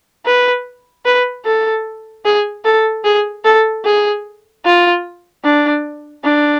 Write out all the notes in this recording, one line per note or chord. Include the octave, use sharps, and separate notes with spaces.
B4
B4
A4
G#4
A4
G#4
A4
G#4
F4
D4
D4